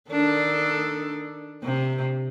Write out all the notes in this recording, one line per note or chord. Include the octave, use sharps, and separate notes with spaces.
D#3 D4 A4
C3